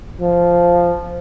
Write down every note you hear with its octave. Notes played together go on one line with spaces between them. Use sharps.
F3